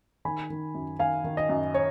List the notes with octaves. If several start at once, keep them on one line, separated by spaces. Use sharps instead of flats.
D#3 G#5 B5
D#3
F#2
D#3 F5 G#5
D#3
D#5
F#2
C#5